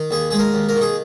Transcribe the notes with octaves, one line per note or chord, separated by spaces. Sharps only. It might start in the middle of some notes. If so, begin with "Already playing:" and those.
Already playing: D#3
D#2 G#4
G#3 G#4
A#4
D#2
A#4
D#3
G#4